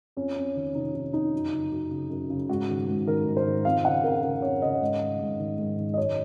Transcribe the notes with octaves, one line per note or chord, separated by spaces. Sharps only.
F2 C#4
F2
D#3
C3 D#4
F2 D#4
F2 D#4
F#2
C#3
F#2
C#3
F#2
C#3
G#2 F#4
D#3
G#2
D#3 A#4
G#2
C5
D#3
F2 F5
C#3 F#5
F2 A#4
C#3 A#4
F2 C#5
C#3 D#5
G#2
D#3
G#2
D#3
G#2
D#3
D#5
F#2 C#5